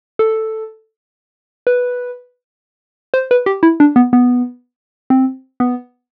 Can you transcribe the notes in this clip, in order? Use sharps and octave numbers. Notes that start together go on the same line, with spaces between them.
A4
B4
C5
B4
G4
E4
D4
B3
B3
C4
B3